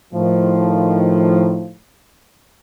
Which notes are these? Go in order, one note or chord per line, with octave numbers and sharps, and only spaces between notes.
A2 D#3 F3